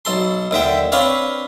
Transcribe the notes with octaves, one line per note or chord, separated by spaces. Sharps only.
B1 A4 C6
D#2 D3 E5 G5
C4 D4 B4 C#5 F5